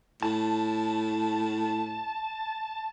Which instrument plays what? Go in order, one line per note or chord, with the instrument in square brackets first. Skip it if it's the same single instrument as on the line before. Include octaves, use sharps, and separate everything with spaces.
[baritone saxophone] A2 [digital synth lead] A5